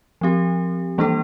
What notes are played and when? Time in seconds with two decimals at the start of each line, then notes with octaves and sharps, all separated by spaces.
0.21 F3 C4 G4
0.98 E3 G3 A#3 D4 A4